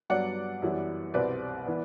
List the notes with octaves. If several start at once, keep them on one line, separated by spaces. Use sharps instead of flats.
G2 F#3 B3 D5 F#5
F#2 E3 G3 B3
C2 B2 G3 C4 B4 D5
E3 B3